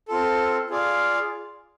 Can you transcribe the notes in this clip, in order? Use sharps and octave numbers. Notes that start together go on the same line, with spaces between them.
C4 F4 A4
F4 G#4 D5 F5